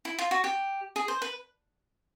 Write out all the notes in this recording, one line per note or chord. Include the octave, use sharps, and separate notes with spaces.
E4
F4
F#4
G4
G#4
C5
B4